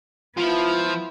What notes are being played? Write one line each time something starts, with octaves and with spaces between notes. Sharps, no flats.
F3 B3 E4 F4